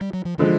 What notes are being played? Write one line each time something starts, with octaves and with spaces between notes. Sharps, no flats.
G3
F#3
F3
D3 E3 F3 G#3